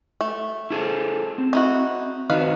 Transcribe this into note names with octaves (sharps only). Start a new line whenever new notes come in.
A3
E4 G#4 A4
C4
D#4 E4 F#4
D#3 D#4 F#4 B4 F5